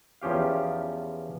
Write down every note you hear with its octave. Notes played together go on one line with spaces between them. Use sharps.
E2 F3 C#4 G4 F5